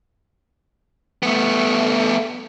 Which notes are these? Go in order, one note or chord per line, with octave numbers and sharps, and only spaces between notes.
A3 B3